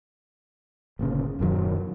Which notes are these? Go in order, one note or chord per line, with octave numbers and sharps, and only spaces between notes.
G1 A#2 C#3
D#1 F#2 D#3 F#3